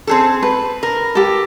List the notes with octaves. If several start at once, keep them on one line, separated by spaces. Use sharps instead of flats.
C4 G#4 A4
B4
A#4
G4 A4